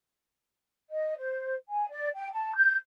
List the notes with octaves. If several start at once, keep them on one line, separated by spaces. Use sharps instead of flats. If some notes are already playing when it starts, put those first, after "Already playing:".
D#5
C5
G#5
D5
G5
A5
G6